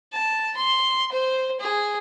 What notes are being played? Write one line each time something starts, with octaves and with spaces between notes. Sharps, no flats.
A5
C6
C5
G#4